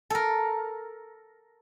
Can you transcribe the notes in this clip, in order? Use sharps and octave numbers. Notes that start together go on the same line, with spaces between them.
A4 A#4